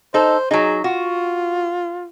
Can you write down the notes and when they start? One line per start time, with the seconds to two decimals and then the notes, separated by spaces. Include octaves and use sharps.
0.14 D#4 A4 C5
0.51 F#3 D#4 G#4
0.84 F4 F#4